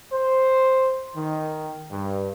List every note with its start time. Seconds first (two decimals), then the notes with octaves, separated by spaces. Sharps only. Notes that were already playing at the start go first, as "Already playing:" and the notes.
0.12 C5
1.16 D#3
1.91 G2